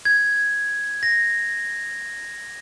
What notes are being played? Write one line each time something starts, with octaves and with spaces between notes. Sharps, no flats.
G#6
A#6